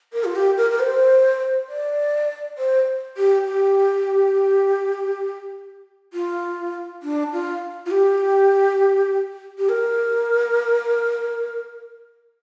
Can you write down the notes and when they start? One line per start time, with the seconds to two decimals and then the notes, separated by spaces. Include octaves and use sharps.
0.13 A#4
0.25 F4
0.35 G4
0.57 A#4
0.71 A#4
0.79 C5
1.69 D5
2.58 C5
3.17 G4
3.46 G4
6.13 F4
7.03 D4
7.32 F4
7.86 F4
7.91 G4
9.58 G4
9.69 A#4